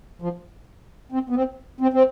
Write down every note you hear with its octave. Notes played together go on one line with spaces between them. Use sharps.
F3
C4
B3
C4
C4
C4